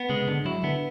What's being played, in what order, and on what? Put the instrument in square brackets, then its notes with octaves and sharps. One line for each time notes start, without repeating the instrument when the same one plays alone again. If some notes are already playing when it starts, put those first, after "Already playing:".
Already playing: [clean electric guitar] B3
[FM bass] C#3 [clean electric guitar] G#3
[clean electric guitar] G#2 [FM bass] D3
[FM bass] F#3 [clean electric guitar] E4
[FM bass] D3 [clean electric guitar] B3